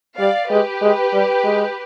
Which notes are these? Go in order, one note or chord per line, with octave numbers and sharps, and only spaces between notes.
G3 D5 F5
G#3 G4 B4
G#3
G3
G#3